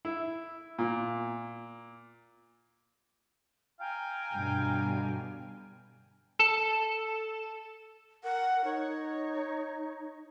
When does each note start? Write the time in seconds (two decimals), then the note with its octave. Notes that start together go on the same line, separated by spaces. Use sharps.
0.05 E4
0.79 A#2
3.80 F5 G5 G#5 A#5
4.33 G2 B2 D3
6.39 A4
8.24 A#4 F#5
8.64 D#4 C#5